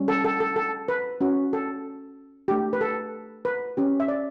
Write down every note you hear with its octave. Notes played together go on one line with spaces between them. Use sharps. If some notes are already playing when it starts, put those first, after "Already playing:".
Already playing: G3 C#4
A4
A4
A4
A4
B4
C#4 F#4
A4
A3 D4 G4
B4
A4
B4
C#4 G4
E5
D5